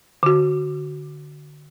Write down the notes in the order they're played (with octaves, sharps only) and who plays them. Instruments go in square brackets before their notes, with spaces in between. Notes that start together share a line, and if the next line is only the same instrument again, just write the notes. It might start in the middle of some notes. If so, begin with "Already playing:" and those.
[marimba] D3 F#4